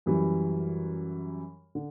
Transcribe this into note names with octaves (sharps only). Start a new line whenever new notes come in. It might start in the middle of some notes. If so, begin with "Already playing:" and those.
F#2 E3 G3
D3